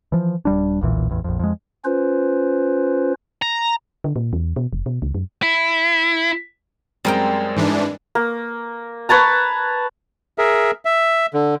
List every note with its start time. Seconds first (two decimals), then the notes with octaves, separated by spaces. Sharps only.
0.12 E3 F3
0.45 D#1 G3 D4
0.81 E1 B1 A#2 E3
1.09 A1 E2
1.24 A#1 F2
1.39 F2 G#3
1.85 C#4 F4 B4 C5
3.42 A#5
4.04 D3
4.16 A#2
4.33 E2
4.56 B2
4.73 F1
4.86 B2
5.02 C#2
5.15 F#2
5.43 E4
7.05 F#2 G3 G#3 C4 A#4 G5
7.56 G#2 E3 D4
8.15 A#3
9.09 B4 C#5 A5 A#5
10.38 G#4 A#4 E5
10.85 E5
11.34 D3